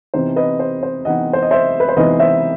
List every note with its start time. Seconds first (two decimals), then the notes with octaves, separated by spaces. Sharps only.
0.14 C3 E3 B3 D#4 C5
0.36 B4 D#5
0.60 C5
0.83 C5
1.05 C3 E3 B3 D#4 D#5 F#5
1.33 C5
1.42 D#5
1.51 C5 E5
1.80 B4
1.89 C5
1.97 C3 E3 B3 D#4 B4 D#5
2.20 C5 E5